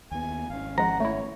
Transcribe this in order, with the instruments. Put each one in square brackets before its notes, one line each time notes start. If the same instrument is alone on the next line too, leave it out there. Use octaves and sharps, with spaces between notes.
[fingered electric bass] D#2 B3 [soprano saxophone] G#5
[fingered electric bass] G#1 C#4 [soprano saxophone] F5
[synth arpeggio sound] F3 G#3 [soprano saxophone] F#5 [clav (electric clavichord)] A#5
[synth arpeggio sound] A3 E4 [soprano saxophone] C#5